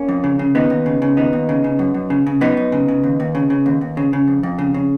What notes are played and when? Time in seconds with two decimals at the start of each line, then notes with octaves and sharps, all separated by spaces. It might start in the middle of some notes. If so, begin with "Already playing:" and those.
Already playing: A#3 C#4
0.09 F2
0.24 C#3
0.39 C#3
0.55 D#2 B3 D#4
0.70 D#2
0.86 C#3
1.02 C#3
1.17 D#2 B3 D#4
1.33 D#2
1.49 C#3
1.64 C#3
1.79 F#2
1.94 F#2
2.10 C#3
2.27 C#3
2.41 F#2 B3 D#4
2.57 F#2
2.72 C#3
2.88 C#3
3.04 D#2
3.20 D#2
3.35 C#3
3.50 C#3
3.66 D#2
3.81 D#2
3.97 C#3
4.13 C#3
4.28 F2
4.43 F2
4.58 C#3
4.74 C#3